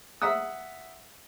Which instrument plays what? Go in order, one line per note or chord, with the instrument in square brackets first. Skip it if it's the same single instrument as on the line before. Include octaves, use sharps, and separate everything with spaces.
[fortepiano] E5 F#5 D#6 E6